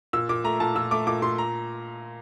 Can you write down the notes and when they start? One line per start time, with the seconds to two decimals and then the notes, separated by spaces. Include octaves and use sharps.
0.13 A#2 E6
0.29 A#2 D6
0.44 A3 A#5
0.60 A#2 A5
0.75 A#2 E6
0.91 A3 D6
1.07 A#2 D6
1.22 A#2 C6
1.38 A#5